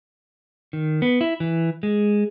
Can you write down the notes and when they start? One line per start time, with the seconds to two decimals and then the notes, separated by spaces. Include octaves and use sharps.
0.73 D#3
1.02 B3
1.21 E4
1.40 E3
1.83 G#3